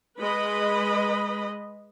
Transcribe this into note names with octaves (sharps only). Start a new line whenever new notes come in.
G#3 B4 D#5 B5